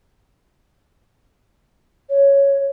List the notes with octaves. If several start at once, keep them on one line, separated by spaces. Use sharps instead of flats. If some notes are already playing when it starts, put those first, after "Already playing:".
C#5